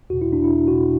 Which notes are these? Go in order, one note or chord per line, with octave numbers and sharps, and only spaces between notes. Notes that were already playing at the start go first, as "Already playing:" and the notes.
E2 B2 F#4
E4
D4
E4
E2 B2 F#4